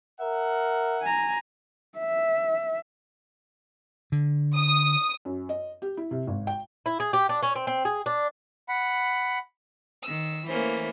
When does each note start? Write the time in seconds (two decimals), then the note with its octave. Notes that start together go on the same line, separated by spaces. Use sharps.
0.20 A#4 E5 F#5
1.01 G#5 A#5
1.99 E5
4.12 D3
4.56 D#6
5.25 F#2
5.49 D#5
5.82 G4
5.97 E4
6.11 C3
6.28 G#1
6.47 G5
6.86 E4
7.00 G#4
7.13 G4
7.29 D4
7.42 C#4
7.55 C4
7.67 C4
7.85 G#4
8.06 D4
8.68 F#5 B5
10.04 D#3 E6
10.49 E3 A3 A#3 C#4 C5